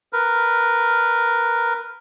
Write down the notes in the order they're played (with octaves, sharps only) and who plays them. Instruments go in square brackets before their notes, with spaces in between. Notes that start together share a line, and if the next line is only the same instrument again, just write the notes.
[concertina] A#4 B4